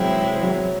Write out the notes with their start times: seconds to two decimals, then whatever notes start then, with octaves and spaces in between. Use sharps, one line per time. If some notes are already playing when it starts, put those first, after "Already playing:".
Already playing: C3 E3 F#3 G#3 C4 E4
0.42 F#3